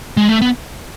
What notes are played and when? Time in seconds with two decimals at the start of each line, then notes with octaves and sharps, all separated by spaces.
0.17 G#3
0.29 A3
0.42 B3